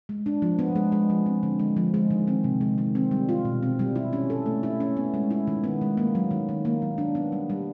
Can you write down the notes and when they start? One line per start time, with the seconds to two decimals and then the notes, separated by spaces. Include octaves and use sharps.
0.09 G#3
0.26 D4
0.42 F3
0.59 B3
0.76 G#3
0.92 G#3
1.10 F3
1.26 C4
1.43 D3
1.59 G#3
1.77 F3
1.94 G#3
2.10 D#3
2.27 C4
2.44 C3
2.61 G#3
2.78 D#3
2.95 C4
3.11 G3
3.29 F4
3.45 B2
3.63 C4
3.79 G3
3.96 E4
4.13 C#4
4.30 A4
4.46 A3
4.63 E4
4.80 C#4
4.97 B3
5.14 G#3
5.31 E4
5.47 D#3
5.64 B3
5.81 G#3
5.97 A#3
6.15 F#3
6.31 D#3
6.49 D#3
6.65 A#3
6.82 F#3
6.98 D4
7.15 B3
7.32 G3
7.50 G3